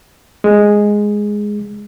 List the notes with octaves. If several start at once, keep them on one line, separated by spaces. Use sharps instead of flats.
G#3